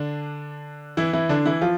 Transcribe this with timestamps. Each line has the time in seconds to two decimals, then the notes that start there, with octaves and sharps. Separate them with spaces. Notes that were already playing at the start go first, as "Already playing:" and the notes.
Already playing: D3 D4
0.97 E3 E4
1.13 E3 E4
1.29 D3 D4
1.45 E3 E4
1.61 F3 F4